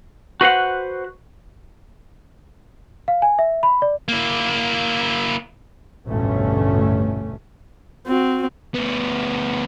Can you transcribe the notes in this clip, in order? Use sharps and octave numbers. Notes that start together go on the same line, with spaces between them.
F#4 B4 C5 F#5
F5
G#5
E5
B5
D5
A#3 E4
A1 D2 G2 B2 A3 C#4
C4 F#4
D2 B3